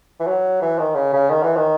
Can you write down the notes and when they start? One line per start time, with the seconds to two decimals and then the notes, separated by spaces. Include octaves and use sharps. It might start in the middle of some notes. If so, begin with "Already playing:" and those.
0.20 E3
0.27 F#3
0.62 E3
0.79 D#3
0.95 C#3
1.13 C#3
1.30 D#3
1.43 E3
1.57 D#3